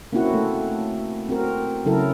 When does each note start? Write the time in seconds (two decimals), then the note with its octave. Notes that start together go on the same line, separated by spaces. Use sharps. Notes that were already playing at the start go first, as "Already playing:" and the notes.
0.13 A#3 C4 C#4 E4 F#4 F#5
0.33 A3 A4
1.29 C4 F#4 A#4
1.85 C#3 F#3 C#4 E4 A4 A#4